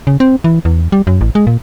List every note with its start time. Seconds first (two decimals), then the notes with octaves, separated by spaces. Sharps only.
0.07 C#3
0.20 C4
0.44 E3
0.65 E2
0.92 G3
1.07 F#2
1.21 A1
1.35 G#3
1.47 A#2